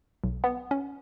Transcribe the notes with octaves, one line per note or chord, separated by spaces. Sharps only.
B1
B3
C#4